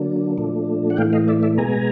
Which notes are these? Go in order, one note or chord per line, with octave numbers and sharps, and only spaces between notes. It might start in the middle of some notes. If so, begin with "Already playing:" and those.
Already playing: D3 F#3 A#3 D4
A#2 F3 A3 D4
F#5
A2 E3 A3 F5 G5
D#5 F5
D5 E5
D5 E5
B2 G#3 B3 G#5 A#5